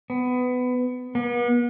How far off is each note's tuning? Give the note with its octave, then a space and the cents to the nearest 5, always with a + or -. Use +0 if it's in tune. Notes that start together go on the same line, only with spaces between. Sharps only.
B3 +20
B3 -45